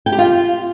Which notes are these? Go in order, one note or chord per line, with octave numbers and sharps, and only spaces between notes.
G5
G4
F4